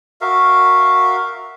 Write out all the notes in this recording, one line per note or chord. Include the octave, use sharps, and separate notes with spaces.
F#4 A#4 E5 F5